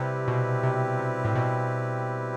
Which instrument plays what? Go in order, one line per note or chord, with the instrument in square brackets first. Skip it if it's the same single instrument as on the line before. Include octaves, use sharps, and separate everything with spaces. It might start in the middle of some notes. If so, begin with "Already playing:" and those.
Already playing: [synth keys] C3 [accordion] G3 C4 E4 G4 B4
[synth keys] B2
C3
C3
A2
B2